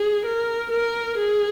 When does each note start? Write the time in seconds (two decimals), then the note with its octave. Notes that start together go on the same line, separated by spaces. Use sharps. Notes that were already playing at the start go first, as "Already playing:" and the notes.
Already playing: G#4
0.25 A#4
0.70 A#4
1.17 G#4